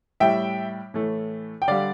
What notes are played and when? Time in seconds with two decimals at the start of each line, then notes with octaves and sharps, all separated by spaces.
0.20 A2 G3 E5 G5
0.94 A2 E3 A3
1.62 G5
1.68 D3 G3 D5 F5